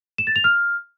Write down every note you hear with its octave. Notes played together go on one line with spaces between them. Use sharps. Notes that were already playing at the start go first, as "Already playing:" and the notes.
E7
A6
F7
F6